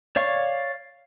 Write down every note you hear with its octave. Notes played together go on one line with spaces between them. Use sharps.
C#5 D5 F5 C#6